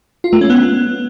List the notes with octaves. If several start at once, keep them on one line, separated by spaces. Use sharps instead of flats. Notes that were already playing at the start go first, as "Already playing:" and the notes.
F4
A3
C#4
B3